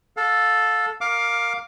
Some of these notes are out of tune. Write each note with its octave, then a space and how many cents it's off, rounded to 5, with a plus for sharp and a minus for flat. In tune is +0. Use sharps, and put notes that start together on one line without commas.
A4 +0 F5 +30
A#4 +0 F5 +15 D6 +0